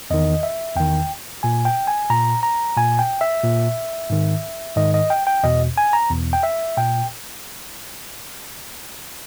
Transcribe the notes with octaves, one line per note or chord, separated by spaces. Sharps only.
E2 D#3 D#5
E5
E2 D#3 G5
A#2 G#5
G5
G#5
A#2 A#5
A#5
A#2 G#5
G5
E5
A#2
G#2 D#3
G#2 D#3 D#5
D#5
G5
G5
E2 B2 D#5
G#5
A#5
E2 B2
G5
E5
A#2 G5